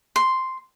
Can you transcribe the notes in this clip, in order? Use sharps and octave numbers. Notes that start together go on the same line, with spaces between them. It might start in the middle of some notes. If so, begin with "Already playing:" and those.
C6